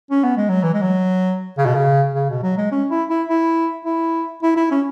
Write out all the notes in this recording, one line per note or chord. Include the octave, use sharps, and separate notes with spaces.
C#4
B3
G#3
F#3
E3
G#3
F#3
C#3
B2
C#3
C#3
B2
F#3
G#3
C#4
E4
E4
E4
E4
E4
E4
C#4